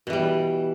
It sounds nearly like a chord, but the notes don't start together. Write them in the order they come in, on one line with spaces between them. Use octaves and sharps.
B2 E3 G3